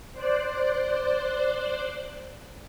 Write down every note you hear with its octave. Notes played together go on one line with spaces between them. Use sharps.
C5 D5 F#6